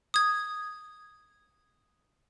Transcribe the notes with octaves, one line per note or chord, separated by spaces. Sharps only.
D#6 G#6